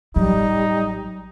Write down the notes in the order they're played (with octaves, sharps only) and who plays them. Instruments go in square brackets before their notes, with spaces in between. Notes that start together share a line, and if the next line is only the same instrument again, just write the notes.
[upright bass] A1 F#3 [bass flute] G3 [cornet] D#4